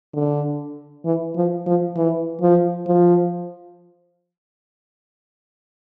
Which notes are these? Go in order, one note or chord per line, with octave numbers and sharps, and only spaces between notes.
D3
E3
F3
F3
E3
F3
F3